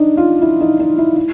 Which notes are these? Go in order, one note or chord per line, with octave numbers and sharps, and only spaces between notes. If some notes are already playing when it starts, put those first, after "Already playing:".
Already playing: D4 D#4
F4
E4
D#4
D#4
E4
E4